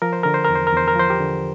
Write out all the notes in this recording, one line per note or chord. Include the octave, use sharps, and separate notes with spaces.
F3 A#4
C5
D3 A#4
C5
E2 A#4
C5
A#4
E2 C5
A#4
F3 C5
G4 A#4
D3